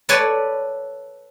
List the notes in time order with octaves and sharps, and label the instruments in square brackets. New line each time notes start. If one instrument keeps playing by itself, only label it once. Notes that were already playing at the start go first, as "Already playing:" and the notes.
[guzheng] A4 B4 C#5 D5 G#5